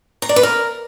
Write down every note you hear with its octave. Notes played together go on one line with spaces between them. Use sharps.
A#5
D5
B4
A#4